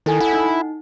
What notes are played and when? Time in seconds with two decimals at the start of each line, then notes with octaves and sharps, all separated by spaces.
0.06 D#3 E4 A4 G#5
0.20 E4 F#5
0.33 D#4